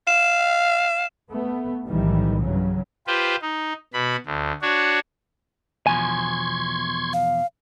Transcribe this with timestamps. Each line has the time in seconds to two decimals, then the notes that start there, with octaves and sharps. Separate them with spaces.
0.07 F5 E7
1.30 A3 B3
1.87 B1 A2 D#3 E3 G3
2.42 G2 C#3 F#3
3.07 F4 G4 B4 C5
3.42 D#4
3.93 B2 B5
4.26 D2
4.62 D4 F#4 C#5
5.87 E2 B2 F3 G#5 C6 C#6 G#6
7.13 F5